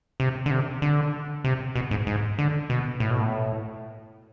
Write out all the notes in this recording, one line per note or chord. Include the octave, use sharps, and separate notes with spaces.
C3
D3
C3
D3
C3
B2
G#2
G#2
D3
B2
A2
B2
A2